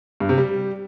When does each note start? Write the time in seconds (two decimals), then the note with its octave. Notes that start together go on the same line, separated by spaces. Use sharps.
0.20 G2
0.29 C3
0.38 G3